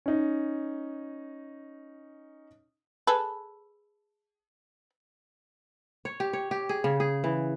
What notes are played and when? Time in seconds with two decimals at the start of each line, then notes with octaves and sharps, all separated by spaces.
0.06 C#4 D#4
3.07 G#4 A4 B4
6.05 C#5
6.20 G4
6.33 C#5
6.51 G4
6.69 G#4
6.84 C#3
7.00 G#4
7.24 E3